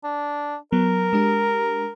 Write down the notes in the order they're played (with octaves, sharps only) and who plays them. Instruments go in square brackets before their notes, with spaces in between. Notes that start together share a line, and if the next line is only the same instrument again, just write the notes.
[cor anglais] D4
[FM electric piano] F#3 B3 [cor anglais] A#4
[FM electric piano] G#3 D4 G4